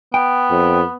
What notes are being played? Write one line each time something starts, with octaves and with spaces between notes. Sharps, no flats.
B3 G5
F2